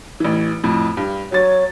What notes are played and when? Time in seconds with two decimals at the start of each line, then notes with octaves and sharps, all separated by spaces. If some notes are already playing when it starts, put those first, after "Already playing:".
0.20 A1 E3
0.64 F2 A2
0.97 G2
1.32 F#3 C#5 A6